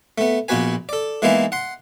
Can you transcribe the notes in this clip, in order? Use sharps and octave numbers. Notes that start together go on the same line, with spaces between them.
A3 B3
A#1 A#2 B3 F#4 B4 G#5
A4 D5
E3 G#3 A#3 B3 D#4 E4
F#5 C6